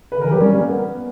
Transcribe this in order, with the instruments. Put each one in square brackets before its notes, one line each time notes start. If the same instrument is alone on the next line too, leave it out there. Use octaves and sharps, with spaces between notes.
[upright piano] B4
[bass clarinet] D3
[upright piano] A#4
[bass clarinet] E3
[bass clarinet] F#3 [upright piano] G4
[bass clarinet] G3 [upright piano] C#4
[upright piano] A#3
B3